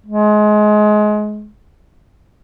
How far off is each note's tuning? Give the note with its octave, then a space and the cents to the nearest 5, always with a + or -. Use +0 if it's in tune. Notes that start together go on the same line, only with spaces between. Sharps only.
G#3 +25